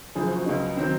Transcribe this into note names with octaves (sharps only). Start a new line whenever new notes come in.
F#1 F#2 F3 G#4
F#4
C#2 C#3 F#3 D#4
D#3 F#3 C4